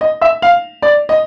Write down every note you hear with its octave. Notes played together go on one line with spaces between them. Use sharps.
D#5
E5
F5
D5
D#5